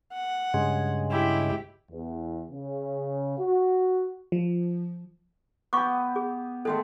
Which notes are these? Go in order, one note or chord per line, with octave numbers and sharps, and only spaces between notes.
F#5
G2 C#3 G#3
E4 G4
E2
C#3
F#4
F3
B3 G4 C#6 D6
G#4
D#3 G#3 A3 A4